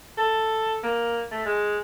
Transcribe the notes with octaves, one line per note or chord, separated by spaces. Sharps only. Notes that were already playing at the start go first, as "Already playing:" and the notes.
A4
A#3
A3
G#3